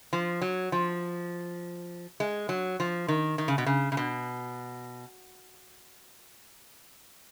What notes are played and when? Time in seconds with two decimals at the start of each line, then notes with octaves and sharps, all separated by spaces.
0.13 F3
0.41 F#3
0.72 F3
2.20 G#3
2.49 F#3
2.80 F3
3.08 D#3
3.38 D#3
3.48 C#3
3.58 B2
3.66 C#3
3.92 C#3
3.97 B2